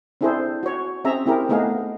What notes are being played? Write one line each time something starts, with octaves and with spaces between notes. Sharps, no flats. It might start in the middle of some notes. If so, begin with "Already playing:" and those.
C4 D4 E4 G#4 A4 C5
F#4 C#5
C4 C#4 G#4 E5 A#5
C4 E4 G4 G#4 A#4
A3 B3 D#4 G#4 F5